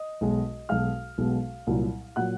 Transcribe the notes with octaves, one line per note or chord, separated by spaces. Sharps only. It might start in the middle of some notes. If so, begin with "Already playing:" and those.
Already playing: D#5 D#6
B1 B2 G#3
B1 B2 G#3 F5 F6
B1 B2 G#3
C2 A#2 F#3
A#2 F#3 F#5 F#6